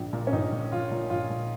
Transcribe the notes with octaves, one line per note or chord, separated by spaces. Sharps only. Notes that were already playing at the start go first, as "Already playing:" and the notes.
Already playing: A#1
A#2
C#4
A#1 D#4
A#2
A#1 F4
A#2
A#1 F4
A#2